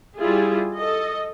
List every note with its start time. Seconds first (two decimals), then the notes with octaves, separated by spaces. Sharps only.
0.17 G3 E4 F4 G#4
0.75 A4 D#5